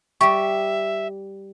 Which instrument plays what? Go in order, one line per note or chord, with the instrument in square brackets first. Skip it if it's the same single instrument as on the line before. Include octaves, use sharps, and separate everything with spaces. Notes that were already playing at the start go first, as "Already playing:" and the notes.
[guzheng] G3 G4 [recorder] E5 [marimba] C#6